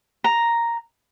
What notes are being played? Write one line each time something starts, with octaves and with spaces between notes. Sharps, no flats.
A#5